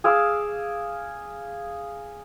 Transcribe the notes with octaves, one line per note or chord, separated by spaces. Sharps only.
G#4 F5 D6 E6